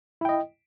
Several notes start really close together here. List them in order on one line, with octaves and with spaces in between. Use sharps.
E4 G5 D#5